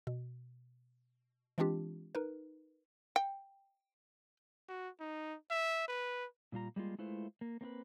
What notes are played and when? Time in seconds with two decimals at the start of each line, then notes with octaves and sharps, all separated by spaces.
0.07 B2
1.58 E3 G#3 C4 D4 F4 G4
2.15 D#4 A#4 B4
3.16 G5
4.68 F#4
5.00 D#4
5.50 E5
5.88 B4
6.52 A#2 G3 F4 A#5
6.76 G3 G#3 A#3 F4
6.98 G#3 A3 E4 F4 B4 C5
7.41 A#3
7.61 A#3 C4 F4 B4